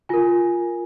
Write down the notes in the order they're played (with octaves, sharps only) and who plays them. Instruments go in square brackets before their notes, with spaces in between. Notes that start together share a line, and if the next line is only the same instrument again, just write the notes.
[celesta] F4 A#4 G#5